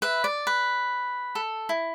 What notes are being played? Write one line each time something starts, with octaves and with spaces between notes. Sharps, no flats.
B4 E5
D5
B4
A4
E4